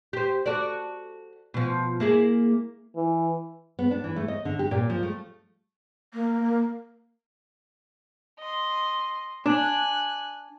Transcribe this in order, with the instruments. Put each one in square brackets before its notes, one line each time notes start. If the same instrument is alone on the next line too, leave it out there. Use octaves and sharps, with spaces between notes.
[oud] G4 C5
F#4 A4 D5
B2 F3
A#3 E4 G#4
[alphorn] E3
[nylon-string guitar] B3
D4
E3
A3
D#5
D3
G4
A#2
F3
A3
[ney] A#3
[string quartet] D#5 C6
[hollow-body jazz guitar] D4 [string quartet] G#5 F#6